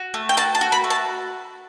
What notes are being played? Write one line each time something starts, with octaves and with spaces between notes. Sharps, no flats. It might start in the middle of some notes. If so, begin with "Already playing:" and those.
Already playing: F#4
A3
G5
F#4 A5
A5
F#4
B5
A3
A5